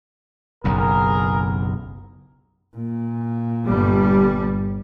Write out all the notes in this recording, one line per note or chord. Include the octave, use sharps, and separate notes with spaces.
F#1 B1 F#2 G#4 A#4
A#2
G1 G3